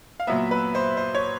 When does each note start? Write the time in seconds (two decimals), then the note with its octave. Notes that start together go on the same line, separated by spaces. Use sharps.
0.20 F5
0.27 A#2 F#3 B3 E5
0.51 B4
0.75 C5
0.97 C5
1.15 C#5